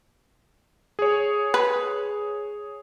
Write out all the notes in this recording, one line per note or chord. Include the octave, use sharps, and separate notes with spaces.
G#4 C#5
B4